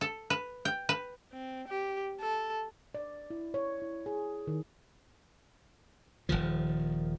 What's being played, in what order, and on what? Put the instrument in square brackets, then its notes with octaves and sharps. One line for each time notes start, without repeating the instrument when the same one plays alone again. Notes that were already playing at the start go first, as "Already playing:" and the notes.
[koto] A4
B4
G5
B4
[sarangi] C4
G4
A4
[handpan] D5
E4
C#5
E4
G#4
D#3
[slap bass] D#1 B1 D#3 F3